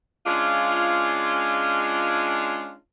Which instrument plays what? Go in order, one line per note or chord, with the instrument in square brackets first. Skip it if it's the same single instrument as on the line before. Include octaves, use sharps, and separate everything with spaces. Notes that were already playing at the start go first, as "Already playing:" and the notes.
[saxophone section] G#3 C#4 D4 F4